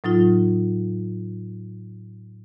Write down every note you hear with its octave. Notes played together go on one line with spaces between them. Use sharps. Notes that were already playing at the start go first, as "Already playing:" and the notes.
A2 F#3 D#4 F4